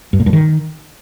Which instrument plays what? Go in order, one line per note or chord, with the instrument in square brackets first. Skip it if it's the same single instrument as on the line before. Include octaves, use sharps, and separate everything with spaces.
[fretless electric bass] G2
A#2
G2
D#3